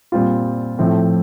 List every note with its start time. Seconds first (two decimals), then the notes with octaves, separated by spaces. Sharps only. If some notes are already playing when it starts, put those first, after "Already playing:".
0.12 A#2 G3 C4 F4
0.79 A2 F3 A3 C4